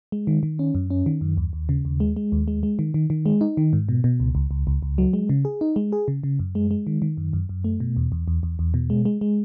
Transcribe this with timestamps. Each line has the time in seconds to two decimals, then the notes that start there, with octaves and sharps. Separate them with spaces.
0.12 G#3
0.27 D#3
0.43 D#3
0.59 C#4
0.75 F#2
0.90 C#4
1.06 D#3
1.21 F#2
1.37 D#2
1.53 D#2
1.69 C#3
1.85 D#2
2.00 G#3
2.16 G#3
2.32 D#2
2.48 G#3
2.63 G#3
2.79 D#3
2.94 D#3
3.10 D#3
3.26 G#3
3.41 D#4
3.57 D#3
3.73 G#2
3.89 B2
4.04 B2
4.20 C#2
4.35 C#2
4.51 C#2
4.67 C#2
4.82 C#2
4.98 F#3
5.13 G#3
5.29 C#3
5.45 G#4
5.61 D#4
5.76 G#3
5.92 G#4
6.08 C#3
6.23 C#3
6.39 F#2
6.55 G#3
6.71 G#3
6.87 D#3
7.02 D#3
7.17 F#2
7.33 F#2
7.49 F#2
7.64 A3
7.80 B2
7.96 E2
8.12 E2
8.28 E2
8.43 E2
8.59 E2
8.74 B2
8.90 G#3
9.05 G#3
9.21 G#3